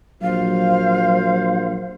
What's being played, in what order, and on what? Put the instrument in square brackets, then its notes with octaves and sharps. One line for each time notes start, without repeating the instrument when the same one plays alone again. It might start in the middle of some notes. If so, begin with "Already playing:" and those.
[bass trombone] A#1 [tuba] F#3 [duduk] C5 [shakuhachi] F5